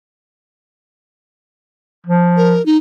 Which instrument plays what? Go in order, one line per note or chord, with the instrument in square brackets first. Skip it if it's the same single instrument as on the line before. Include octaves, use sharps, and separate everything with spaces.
[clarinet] F3
[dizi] A#4
D#4